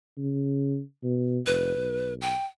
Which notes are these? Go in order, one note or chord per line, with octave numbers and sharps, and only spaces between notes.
C#3
B2
F1 B4
B1
G5